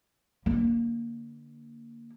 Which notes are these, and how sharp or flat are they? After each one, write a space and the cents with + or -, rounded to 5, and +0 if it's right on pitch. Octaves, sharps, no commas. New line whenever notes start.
D3 +0 A#3 +0